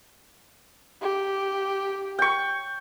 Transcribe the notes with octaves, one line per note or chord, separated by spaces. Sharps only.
G4
G5 C#6